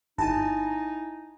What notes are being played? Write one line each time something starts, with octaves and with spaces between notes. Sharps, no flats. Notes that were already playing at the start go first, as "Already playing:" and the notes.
G1 D#4 E4 G#5 A5